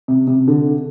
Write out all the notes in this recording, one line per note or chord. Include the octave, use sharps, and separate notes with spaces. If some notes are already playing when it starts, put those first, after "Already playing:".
C3
C3
D3